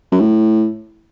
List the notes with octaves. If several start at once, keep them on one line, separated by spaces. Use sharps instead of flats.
F#2
A2